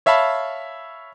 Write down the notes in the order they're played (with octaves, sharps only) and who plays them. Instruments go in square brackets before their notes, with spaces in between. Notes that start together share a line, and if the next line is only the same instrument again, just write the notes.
[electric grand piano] C#5 E5 F5 A5 B5